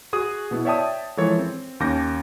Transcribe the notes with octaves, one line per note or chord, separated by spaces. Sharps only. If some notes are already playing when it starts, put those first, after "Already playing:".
F#4 G#4 D#6
B2 B3 E4
C#5 D5 E5 G5 A5 D#6
E3 F3 G#3 A4 A#4 C#5
C4
D#2 C#4 D6 G6 A#6